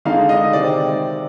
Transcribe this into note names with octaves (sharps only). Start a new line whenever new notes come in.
D3 G#3 D#4 F5
D#5
C3 D#3 G#3 C4 D5